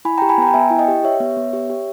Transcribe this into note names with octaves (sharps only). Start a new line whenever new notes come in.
E4 G#5 B5
G4 G5 A#5
G#5 B5
B3 G5 A#5
G5
B3 E5 G#5
E4
D#5 G5
G4
G4 C#5 E5
B3
B3
G4
G4